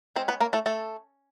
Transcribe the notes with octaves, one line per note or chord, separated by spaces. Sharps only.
G#3 C4 C#4 C5
B3 B4
A#3 A#4
A3 A4
A3 A4